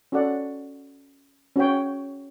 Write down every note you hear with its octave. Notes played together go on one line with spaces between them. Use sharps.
C#4 F#4 A4 D5 F#5
C#4 F#4 C#5 G5